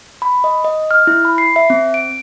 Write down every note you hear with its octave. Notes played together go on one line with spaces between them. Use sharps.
B5
D#5
D#5
F6
E4
B5
C7
E5
C4
D7